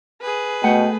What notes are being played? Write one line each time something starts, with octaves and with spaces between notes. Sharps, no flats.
G#4 B4
B2 A3 A4 F#5 G5